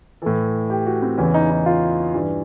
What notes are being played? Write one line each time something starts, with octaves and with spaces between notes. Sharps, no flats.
A2 E3 A4
G4
F#4
C4
E2 C#3 E3 C#4
D#4
D#4
F4
G2 E3